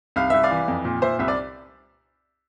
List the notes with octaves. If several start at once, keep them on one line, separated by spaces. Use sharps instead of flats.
C2 F5
C2 E5
D5 F5
E3
F2
A#2
A#2 C5 E5
C2 E5
D5